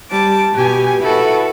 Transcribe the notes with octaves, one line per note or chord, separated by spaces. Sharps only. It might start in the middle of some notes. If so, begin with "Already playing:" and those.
G3 A5 D6
B2 G4 G#5
E4 F#4 A4 B4